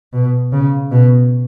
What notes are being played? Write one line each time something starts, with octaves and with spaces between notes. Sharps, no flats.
B2
C#3
B2